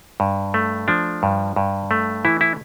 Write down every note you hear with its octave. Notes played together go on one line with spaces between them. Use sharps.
G2
A3
F3 D4
G2
G2
A3
E3 E4
E4